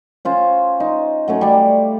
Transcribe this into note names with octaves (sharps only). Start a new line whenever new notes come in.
C#4 F4 C5
D#4
F#3 A3 C#4
G3 D5